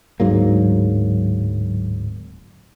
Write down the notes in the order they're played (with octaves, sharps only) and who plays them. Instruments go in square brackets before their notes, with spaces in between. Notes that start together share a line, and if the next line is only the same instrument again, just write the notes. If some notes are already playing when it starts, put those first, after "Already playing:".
[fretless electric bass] D1 G#2 F#3 A#3